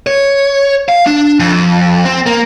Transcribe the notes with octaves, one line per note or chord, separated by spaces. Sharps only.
C#5
F5
D4
F2
C4
A#3